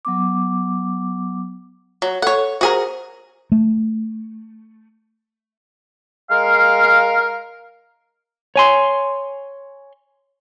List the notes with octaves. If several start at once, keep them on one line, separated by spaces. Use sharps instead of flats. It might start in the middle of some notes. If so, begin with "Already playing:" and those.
F#3 B3 D6
F#3
A4 C#5 F#5
F#4 G#4 A#4 C5
A3
G#3 A#4 F5
C#5 G#5 C6